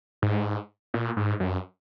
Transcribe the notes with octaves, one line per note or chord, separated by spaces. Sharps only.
G#2
A#2
G#2
F#2